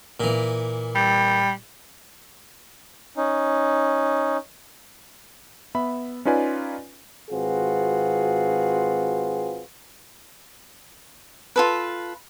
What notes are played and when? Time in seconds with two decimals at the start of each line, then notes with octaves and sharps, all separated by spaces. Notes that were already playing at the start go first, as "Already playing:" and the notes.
0.20 A#2 E3
0.95 G3
3.17 C#4 D#4
5.75 B3 E5 B5
6.25 C#4 D#4 F4 B4 D5 G#5
7.30 G#1 C4 F4 F#4 G#4 B4
11.56 F4 A4 B4